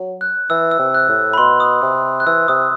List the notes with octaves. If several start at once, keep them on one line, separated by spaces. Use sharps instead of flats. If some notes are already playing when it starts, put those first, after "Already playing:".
Already playing: F#3
F#6
E3 E6
E6
C3
F#6
A2
B5
B2 C6
D#6
C3 D#6
F#6
E3 E6
C3 D#6